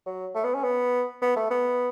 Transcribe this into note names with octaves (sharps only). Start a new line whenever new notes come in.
F#3
A3
B3
C#4
B3
B3
A3
B3